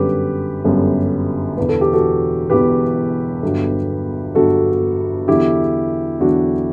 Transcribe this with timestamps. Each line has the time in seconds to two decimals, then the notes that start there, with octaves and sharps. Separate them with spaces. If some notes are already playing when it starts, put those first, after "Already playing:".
Already playing: G1 F#2 D3 G3 G4 B4
0.65 G1 F#2 D3 G3
1.57 E1 E2 D3 B4
1.69 A4
1.81 G4
1.93 F#4 A4
2.50 E1 E2 D3 G4 B4
3.43 G1 G2 D3 F#3
4.35 G1 G2 D3 F#3 F#4 A4
5.28 E2 D3 F#3 E4 G4
6.20 E2 D3 F#3 D4 F#4